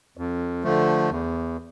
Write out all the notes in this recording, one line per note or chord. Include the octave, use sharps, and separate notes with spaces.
F2
D3 F3 A3
E2